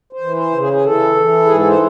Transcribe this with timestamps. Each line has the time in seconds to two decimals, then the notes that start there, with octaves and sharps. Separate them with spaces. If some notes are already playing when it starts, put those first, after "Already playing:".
0.13 C5
0.21 E3
0.37 C5
0.52 C#3
0.60 G#4
0.73 G#4
0.84 E3 A4
1.16 E3
1.45 G#2 G#4
1.57 A4
1.67 C5